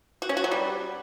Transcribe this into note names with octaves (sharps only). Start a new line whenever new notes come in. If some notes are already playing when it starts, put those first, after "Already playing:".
F#4
C#4
F#4
F#3
G3